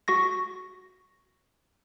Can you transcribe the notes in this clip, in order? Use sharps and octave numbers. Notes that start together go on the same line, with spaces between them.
F#4 C#6 A#6